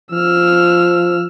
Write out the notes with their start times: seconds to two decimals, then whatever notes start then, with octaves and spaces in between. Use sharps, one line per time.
0.12 F3 E6 F6